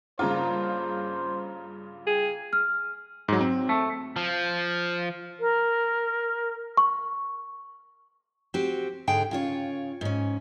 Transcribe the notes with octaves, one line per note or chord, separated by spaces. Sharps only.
G2 C#3 A#3 F4 C5 A#5
G#4 G5
F6
G#2 F#3
C4
A3
F3
A#4
C#6
C4 F#4 G4
G#2 D3 G#4 G5
C#3 F4 C#5
G#2 C#4